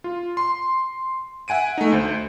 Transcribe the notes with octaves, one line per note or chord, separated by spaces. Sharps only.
F4
C6
E5 F#5 G#5 D7 D#7
A3 D#4
D2 C5